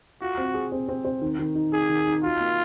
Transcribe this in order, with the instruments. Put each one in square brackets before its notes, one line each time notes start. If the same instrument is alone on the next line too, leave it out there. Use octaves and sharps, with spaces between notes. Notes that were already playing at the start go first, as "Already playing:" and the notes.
[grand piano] F4 [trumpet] F#4
[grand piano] C4
G#4
C4
C4
C4
D#3
D#3
D#4
[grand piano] D#4 [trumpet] G#4
[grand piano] D#3
D#4
[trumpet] F4 [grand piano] F#4
[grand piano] A#3